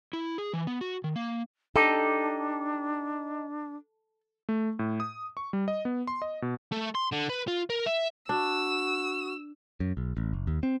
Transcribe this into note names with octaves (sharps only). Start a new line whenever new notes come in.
E4
G#4
E3
B3
F#4
D#3
A#3
D4 D#4 G4 A4
A3
A2
D#6
C#6
G3
D#5
B3
C6
D#5
B2
A3
C6
D3
B4
F4
A#4
E5
D4 F#4 E6
F#2
B1
A1
F#1
D#2
C4